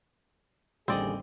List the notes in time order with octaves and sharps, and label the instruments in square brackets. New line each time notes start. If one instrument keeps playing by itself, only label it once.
[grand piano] A1 G3 [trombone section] D#2 D3 G#4 [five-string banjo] C4 D5 D#5